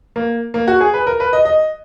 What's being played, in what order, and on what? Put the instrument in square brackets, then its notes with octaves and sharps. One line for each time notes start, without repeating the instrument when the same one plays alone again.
[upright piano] A#3
A#3
F#4
G#4
B4
A#4
B4
D#5
D#5